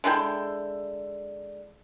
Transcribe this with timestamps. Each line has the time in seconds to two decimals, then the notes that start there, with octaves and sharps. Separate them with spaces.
0.04 D3 G#3 E4 G5